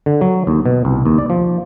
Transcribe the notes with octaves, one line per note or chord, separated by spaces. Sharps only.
D3
F#3
D#2
B2
C2
D#2
D5
F3